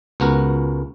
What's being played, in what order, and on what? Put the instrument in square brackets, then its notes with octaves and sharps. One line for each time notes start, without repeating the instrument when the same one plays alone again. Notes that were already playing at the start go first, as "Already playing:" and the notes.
[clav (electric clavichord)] C#2 B3 F#4 A#4